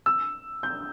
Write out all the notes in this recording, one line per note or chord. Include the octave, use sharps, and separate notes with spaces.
E6
G6